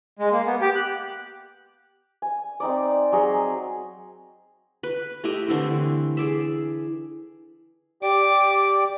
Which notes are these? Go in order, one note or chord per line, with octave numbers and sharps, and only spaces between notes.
G#3
A#3
B3
G4
F#6
G#5
C4 D#4 D5
F#3 G#4 D#5
B4
A3 E4 G4 D#5
D3 E3 C4 E4
G#4 D5 E5
G4 D5 D6